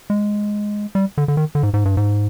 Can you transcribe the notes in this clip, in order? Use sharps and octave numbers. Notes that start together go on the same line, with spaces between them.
G#3
G3
D3
D3
D#3
D3
G#2
G#2
G2
G#2